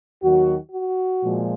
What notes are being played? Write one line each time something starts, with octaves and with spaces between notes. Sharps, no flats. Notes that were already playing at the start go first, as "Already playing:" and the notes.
D#2 D#3 F#3 F#4
F#4
A#2 F3 G#3